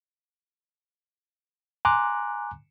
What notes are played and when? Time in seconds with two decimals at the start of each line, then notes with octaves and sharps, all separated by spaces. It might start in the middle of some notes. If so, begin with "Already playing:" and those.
1.85 G#5 A#5 C6 D6 F#6